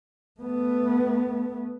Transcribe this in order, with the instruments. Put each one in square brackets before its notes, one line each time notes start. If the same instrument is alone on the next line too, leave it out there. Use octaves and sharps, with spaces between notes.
[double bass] A3 B3